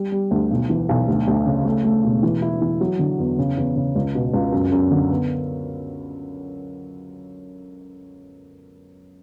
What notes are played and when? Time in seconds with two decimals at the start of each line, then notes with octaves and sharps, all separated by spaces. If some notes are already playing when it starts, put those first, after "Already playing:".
Already playing: G3
0.12 G3
0.31 D2
0.51 B1
0.70 E3
0.89 B1
1.08 D2
1.27 D2
1.46 C#3
1.65 A3
1.84 A3
2.04 E1
2.23 E3
2.42 E4
2.61 E3
2.81 F#3
2.99 D3
3.19 E2
3.38 C#3
3.57 E2
3.76 C#3
3.96 C#2
4.15 B2
4.34 C#2
4.52 F#2
4.72 F#2
4.91 D3
5.10 B3